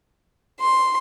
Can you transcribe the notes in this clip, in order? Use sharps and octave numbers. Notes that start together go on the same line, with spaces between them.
C6